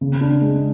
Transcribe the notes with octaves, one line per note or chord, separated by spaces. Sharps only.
C#3
D4
G#3